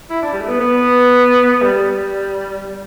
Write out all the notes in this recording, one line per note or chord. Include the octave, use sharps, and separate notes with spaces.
E4
D4
G3
A3
B3
B3
G3